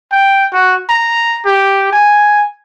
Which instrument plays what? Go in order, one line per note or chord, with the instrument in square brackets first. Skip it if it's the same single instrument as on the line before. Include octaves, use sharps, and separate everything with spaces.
[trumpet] G5
F#4
A#5
G4
G#5